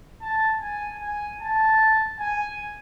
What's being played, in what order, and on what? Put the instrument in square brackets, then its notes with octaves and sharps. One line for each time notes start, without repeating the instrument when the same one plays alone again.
[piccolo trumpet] A5
G#5
G#5
A5
G#5